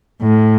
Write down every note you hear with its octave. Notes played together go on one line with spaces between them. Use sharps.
A2